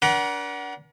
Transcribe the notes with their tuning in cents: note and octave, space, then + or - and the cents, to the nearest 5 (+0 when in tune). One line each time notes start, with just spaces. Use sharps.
D4 -30 A#4 +45 F#5 +15